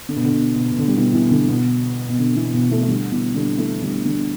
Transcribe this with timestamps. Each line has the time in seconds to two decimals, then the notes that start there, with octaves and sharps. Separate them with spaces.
0.09 D3
0.16 B2
0.24 D3
0.32 B2
0.55 B2
0.72 B2
0.79 D3
0.88 G3
0.96 B2 E3
1.14 B2 E3
1.31 D3
1.48 B2
2.09 B2
2.19 D3
2.36 B2 E3
2.54 B2
2.71 E3 A3
2.82 A3
2.88 D3 G3
3.12 B2 E3
3.35 D3 G3
3.58 E3 A3
3.82 D3 G3
4.05 D3